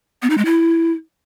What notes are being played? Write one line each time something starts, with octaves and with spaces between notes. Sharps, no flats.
B3
D#4
G#3
E4